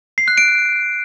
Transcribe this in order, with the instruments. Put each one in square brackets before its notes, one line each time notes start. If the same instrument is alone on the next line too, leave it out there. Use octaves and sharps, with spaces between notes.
[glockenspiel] C7
F#6
D7